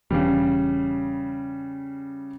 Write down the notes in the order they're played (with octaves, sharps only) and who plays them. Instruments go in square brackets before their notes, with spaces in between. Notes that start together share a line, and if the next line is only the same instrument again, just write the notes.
[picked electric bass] E1 E3 D4 [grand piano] C#3 G3